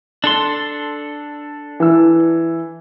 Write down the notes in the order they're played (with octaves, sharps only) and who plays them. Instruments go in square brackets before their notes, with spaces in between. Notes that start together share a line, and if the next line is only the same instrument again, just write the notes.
[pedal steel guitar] D4 A4 C6
[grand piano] E3 E6